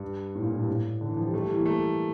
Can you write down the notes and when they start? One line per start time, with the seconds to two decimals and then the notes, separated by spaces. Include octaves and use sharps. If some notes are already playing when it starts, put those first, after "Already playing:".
Already playing: G2
0.35 A2
0.42 A#2
0.52 A2
0.59 G2
0.67 A2
1.01 D3
1.09 E3
1.17 F3
1.26 G3
1.34 A3
1.41 G3
1.49 E3
1.57 A#3
1.66 A3